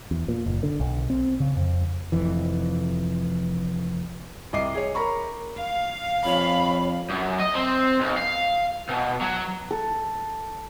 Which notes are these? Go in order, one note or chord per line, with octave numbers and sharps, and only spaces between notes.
E2
A#2
F#1
D3
B1
C4
C#3
F2
F1 F2 E3
C2 D#5 D6 C7
G#4 C#5
A#4 A#5 B5 C#6
F5
F2 C#5 B5
F#2
D#5
C4
B1
F5
B2
F#3
A4